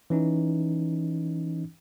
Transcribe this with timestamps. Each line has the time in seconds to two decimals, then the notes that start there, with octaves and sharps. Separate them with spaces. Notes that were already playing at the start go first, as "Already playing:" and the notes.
0.10 E3 C#4 D#4